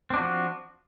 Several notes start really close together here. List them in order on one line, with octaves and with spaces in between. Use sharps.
C4 D4 F#4 F3